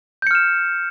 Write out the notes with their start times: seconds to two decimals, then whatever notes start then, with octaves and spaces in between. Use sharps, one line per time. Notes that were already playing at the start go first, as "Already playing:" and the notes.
0.22 G6
0.27 C#7
0.31 F6
0.35 E7